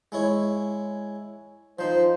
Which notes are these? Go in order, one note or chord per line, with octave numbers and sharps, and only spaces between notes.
G#3 E4 C#5
F3 D#4 C5